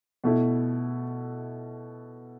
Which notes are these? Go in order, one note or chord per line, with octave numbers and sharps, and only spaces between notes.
B2 A3 E4